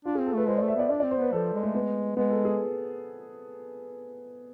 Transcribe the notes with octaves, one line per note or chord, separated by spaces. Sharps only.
D4 F4
C4 G#4
A4
A3 B4
G#3 C5
A3 D5
E5
B3 D5
D4 D5
C4 D5
C5
B3 B4
F3 A4
G#3
A3
B3
G#3 B3
A4
G#4